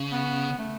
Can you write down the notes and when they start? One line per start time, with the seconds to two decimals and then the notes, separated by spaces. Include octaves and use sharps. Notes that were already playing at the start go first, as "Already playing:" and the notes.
Already playing: C#3
0.12 B3
0.58 A3